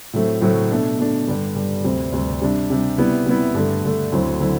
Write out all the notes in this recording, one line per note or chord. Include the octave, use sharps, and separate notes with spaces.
A2 F#3 A3 C4
A2 F#3 A3 C4
B2 A3 D4
B2 A3 D4
G2 D3 G3
G2 D3 G3
D2 C3 G3 C4
D2 C3 G3 C4
C3 G3 D4
C3 G3 D4
C3 G3 B3 E4
C3 G3 B3 E4
G2 D3 A3
G2 D3 A3
D2 D3 F#3 C4 E4
D3 F#3 C4 E4